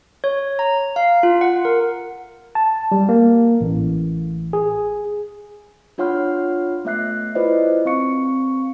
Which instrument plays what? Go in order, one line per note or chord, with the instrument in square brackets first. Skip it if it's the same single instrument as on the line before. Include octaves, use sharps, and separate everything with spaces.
[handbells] C#5
A#5
F5
F4
F#5
A#4
[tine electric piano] A5
G3
A#3
A1
G#4
[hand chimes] D4 F4 C#5 F#5 C6 F6
A3 B3 E5 F#6 C7
E4 F4 B4 C5 D5 D#5
C4 F5 C#6 C#7